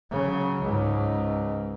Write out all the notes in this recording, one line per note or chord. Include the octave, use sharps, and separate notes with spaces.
C#3 F#3
C#2 G#2